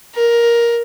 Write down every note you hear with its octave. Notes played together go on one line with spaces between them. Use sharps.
A#4